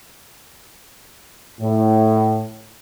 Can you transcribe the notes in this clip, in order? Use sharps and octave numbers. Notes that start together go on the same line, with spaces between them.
A2